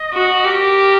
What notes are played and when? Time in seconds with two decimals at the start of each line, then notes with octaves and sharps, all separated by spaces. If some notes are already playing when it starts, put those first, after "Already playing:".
Already playing: D#5
0.14 F#4
0.45 G4 A#4